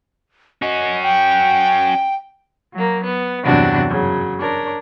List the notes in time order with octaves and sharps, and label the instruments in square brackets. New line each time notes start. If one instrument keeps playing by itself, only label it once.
[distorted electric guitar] C#4 F#4 [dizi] D#5
[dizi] G5
[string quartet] F#3 A#3
B3
E2 G2 C3 F#3 D4 F#4
F#2 C#3 F#3
D4 A#4 C#5